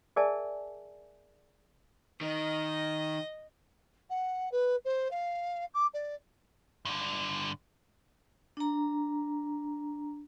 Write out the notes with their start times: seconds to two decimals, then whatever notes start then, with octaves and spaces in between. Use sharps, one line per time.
0.16 G#4 A#4 D5 E5 G#5 A5
2.21 D#3 D#5
4.10 F#5
4.52 B4
4.85 C5
5.11 F5
5.74 D6
5.94 D5
6.85 G2 D3
8.57 D4 A#5